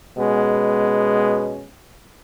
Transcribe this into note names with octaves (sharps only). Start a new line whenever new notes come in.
B2 G#3 B3 C#4